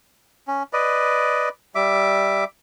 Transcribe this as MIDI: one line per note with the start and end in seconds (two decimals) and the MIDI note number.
0.48 0.63 61
0.73 1.49 71
0.73 1.49 74
0.73 1.49 75
1.75 2.44 55
1.75 2.44 76
1.75 2.44 86